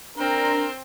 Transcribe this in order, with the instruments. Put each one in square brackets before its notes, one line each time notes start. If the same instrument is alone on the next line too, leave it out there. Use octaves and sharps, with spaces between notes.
[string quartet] C4 C5 G5 [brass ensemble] D4 A#4